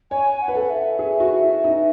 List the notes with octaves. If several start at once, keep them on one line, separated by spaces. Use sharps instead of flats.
C#5 G#5
F#5
B4
A4
F#5
E5
G#4
F#4
E4
D#4